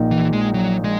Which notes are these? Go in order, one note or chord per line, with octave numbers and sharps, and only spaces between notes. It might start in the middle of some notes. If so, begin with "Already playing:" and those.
Already playing: A#1 A#2 A#3 D#4
E3
G#3
F#3
G#3